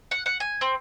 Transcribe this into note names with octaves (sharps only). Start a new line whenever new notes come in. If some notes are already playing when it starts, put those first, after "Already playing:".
F#5
F#5
G#5
C4